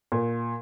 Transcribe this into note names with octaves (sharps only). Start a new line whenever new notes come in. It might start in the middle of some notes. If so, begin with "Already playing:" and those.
A#2